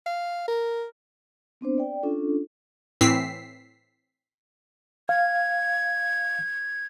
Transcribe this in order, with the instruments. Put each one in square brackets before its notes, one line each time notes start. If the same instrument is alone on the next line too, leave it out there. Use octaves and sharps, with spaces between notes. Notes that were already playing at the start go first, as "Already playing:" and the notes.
[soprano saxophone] F5
A#4
[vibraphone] B3 C4 D4 C5
D5 G5
C#4 D4 F4 A4
[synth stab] A2 E3 C4 E6 B6 C7
[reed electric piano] F5 [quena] G#6